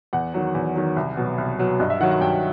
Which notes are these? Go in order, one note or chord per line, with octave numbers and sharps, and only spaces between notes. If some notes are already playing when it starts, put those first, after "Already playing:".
E2 F#5
D#3 F#3
E2
D#3 F#3
C2
B2 F#3
C2
B2 F#3
G2 D#5
E5
D#3 F#3 F#5
F#5
G2 G5